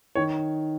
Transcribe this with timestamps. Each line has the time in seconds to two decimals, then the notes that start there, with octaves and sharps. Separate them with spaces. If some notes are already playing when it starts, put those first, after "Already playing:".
0.15 D#3 C#5